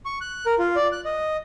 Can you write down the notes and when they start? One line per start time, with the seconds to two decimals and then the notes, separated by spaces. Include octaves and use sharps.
0.06 C#6
0.21 F#6
0.46 A#4
0.59 F4
0.76 D5
0.92 F#6
1.05 D#5